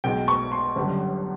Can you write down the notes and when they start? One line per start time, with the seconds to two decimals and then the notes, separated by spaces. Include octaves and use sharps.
0.04 B1 B2 G#3 G5
0.28 C#6
0.52 C6
0.76 G1 F#2 D3 G3